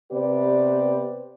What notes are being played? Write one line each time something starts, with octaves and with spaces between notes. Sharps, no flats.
C3 B3 G4 B4 C5 D5